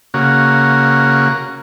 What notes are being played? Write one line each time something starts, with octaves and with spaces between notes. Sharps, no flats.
C#3 A#3 F#4